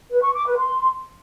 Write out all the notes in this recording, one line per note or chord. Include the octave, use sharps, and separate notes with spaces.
B4
C#6
D6
B4
C6